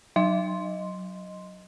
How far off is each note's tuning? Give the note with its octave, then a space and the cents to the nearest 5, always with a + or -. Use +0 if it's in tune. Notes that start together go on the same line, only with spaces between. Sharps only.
F#3 +0 D#5 +0 C6 +0